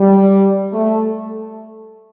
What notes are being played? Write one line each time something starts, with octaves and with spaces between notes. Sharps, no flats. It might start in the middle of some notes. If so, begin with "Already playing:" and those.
Already playing: G3
A3